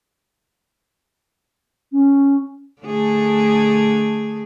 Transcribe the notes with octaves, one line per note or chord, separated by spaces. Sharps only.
C#4
D3 A3 G#4